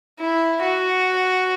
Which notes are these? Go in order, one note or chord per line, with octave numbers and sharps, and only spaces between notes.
E4
F#4